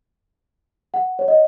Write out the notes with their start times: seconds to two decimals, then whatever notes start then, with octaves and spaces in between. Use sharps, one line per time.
0.94 F#5
1.19 C#5
1.28 D#5